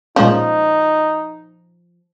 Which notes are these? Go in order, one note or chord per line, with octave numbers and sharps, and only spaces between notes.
A#2 F3 G#3 C#4 D#4